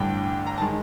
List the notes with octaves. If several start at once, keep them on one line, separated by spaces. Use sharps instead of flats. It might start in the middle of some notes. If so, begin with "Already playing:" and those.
Already playing: A1 G2 D3 G5
A#5
D#3 G#3 A5